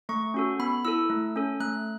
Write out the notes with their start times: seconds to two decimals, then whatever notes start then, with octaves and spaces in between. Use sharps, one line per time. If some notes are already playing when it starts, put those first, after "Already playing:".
0.09 A3 C#6
0.34 C#4 F#4 A4
0.59 B3 B5
0.85 E4 A4 E6
1.10 A3
1.36 C#4 A4
1.60 A3 F#6